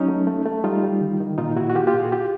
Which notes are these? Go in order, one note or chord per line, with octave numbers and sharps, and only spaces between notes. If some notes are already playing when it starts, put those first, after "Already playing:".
Already playing: F#3 C#4 D#4
A3
A3
A3
G3 D#4 F4
G3
D#3
D#3
A#2 D#4 F4
A#2 E4 F#4
F#4
A#3 F4 G4
F4 G4
A#2
F#4 G#4
F4 G4